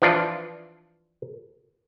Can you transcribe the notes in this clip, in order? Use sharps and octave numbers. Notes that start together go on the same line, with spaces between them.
E3 F3 D4 F4